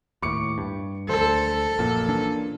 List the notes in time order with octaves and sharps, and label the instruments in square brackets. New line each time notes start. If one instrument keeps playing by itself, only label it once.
[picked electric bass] D#2 A2 [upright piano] C#6 D6 C#7
[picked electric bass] G2
[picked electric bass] D2 [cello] A4 [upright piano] C5
[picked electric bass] A#1 F#2 [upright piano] A#2
[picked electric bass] E3 C#4 D4